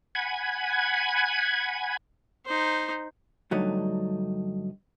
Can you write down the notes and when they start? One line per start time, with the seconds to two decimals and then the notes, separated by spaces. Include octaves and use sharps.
0.15 F#5 G#5 B5 G#6
2.45 D#4 C5
3.51 G2 D3 F#3 A3 D#4